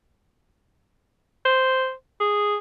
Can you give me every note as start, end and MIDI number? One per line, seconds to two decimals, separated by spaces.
1.45 1.92 72
2.20 2.57 68